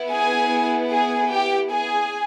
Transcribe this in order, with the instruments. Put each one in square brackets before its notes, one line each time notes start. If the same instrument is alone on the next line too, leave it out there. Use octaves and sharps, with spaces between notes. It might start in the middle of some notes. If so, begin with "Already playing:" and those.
Already playing: [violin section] B3 E4
G#4 G#5
G#4 G#5
G4 G5
G#4 G#5